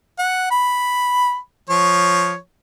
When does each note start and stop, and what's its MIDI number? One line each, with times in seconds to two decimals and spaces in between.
0.19 0.49 78
0.51 1.36 83
1.69 2.36 53
1.69 2.36 73